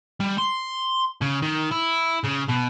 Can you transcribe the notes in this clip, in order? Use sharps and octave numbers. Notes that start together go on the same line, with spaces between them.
G3
C6
C#3
D#3
E4
C#3
B2